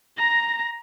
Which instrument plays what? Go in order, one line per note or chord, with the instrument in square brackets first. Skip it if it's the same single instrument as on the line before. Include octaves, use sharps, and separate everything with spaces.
[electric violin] A#5 A#6